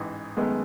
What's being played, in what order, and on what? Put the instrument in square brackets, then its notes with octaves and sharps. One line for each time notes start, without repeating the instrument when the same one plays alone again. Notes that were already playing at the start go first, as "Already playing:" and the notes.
Already playing: [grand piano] A1 G#2 E3
[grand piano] F#2 D#3 A3 [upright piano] G#3 B3